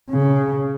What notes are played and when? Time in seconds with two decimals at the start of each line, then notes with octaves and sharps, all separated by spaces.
0.10 C#3